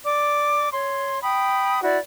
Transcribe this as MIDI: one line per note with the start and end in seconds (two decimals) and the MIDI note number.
0.04 0.68 74
0.04 0.68 86
0.71 1.19 73
0.71 1.19 84
1.22 1.82 79
1.22 1.82 83
1.22 1.82 87
1.82 1.98 64
1.82 1.98 66
1.82 1.98 74